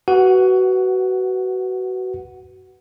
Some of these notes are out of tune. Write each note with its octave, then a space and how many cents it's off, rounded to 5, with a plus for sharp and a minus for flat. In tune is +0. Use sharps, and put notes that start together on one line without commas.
F#4 +20 B4 +0 F#5 +0